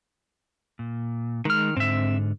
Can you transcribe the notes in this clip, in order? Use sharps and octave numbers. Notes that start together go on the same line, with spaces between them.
A#2
D#3 G#3 F6
G#2 D3 C4 E5